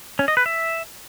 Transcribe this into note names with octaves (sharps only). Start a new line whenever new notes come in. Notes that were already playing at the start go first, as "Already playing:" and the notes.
C#4
D#5
B4
E5